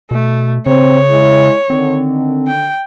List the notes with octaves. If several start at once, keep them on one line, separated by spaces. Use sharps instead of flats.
B2 A3
C#3 C4 C#5
G#3 E4
D3 D#3 C4
G5